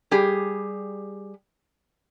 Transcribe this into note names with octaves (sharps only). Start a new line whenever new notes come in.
G3 G4 G#4